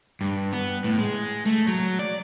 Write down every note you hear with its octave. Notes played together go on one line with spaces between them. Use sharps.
G2
B3
A2
G#3
A3
F#3
D5